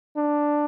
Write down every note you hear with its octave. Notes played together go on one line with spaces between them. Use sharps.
D4